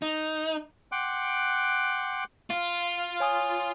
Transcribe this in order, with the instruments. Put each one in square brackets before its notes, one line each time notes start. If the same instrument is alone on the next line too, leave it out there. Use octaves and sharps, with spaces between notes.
[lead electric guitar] D#4
[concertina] F#5 G5 C6 D6 F#6
[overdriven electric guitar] F4
[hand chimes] C#5 G#5 D#6